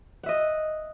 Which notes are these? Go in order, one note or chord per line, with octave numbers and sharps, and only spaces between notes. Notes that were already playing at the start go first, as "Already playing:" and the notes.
D#5 E5 F#5